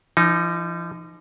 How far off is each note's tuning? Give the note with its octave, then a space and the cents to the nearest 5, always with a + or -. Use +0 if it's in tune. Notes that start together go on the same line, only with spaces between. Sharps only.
F3 -45 D#4 +0